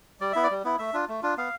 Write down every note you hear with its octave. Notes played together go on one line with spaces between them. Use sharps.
G3 D5
B3 E4 E5
D5
G3
B3 E4
A3 E5
D4 F4
A3
D4 F4
B3 F5